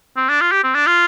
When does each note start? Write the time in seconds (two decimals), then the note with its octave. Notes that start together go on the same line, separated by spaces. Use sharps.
0.16 C4
0.29 D4
0.41 F4
0.52 G4
0.64 C4
0.75 D4
0.87 F4